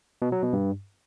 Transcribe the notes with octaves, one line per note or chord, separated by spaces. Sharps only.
B2
F#3
B2
G2